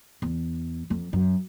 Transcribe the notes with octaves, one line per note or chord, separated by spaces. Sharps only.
E2
F2
F#2